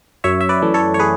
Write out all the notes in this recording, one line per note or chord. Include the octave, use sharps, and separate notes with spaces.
F#2 C#5 E5
E5
B4 D5
E3 A3
A4 C#5
C#5
G#4 B4